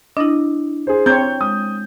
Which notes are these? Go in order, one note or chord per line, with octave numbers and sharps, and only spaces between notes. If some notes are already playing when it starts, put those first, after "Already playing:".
D4 E4 D#5
G#4 C5
C4 C#5 A#5 G6
G#3 D#6